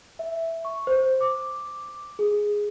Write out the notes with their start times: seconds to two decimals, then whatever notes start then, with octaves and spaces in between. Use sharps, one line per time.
0.19 E5
0.65 C#6
0.87 C5
1.21 D6
2.19 G#4